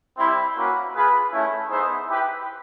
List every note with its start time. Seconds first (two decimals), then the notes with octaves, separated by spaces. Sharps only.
0.18 G3 C4 E4
0.56 A#3 C#4 F#4 B4
0.94 F4 G#4 B4
1.31 A3 C#4 E4
1.70 B3 D#4 G#4 C5 E5
2.06 E4 G4 B4